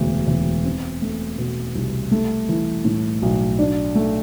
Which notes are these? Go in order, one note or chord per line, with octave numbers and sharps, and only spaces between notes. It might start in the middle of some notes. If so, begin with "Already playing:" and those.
Already playing: E1 D2 C3
E1
C4
A3
B2
C2
A3
E3
A2
B1
D4
A3